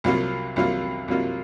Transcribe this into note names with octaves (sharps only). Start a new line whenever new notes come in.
C2 C3 F#3 A#3 F4
C2 C3 F#3 A#3 F4
C2 C3 F#3 A#3 F4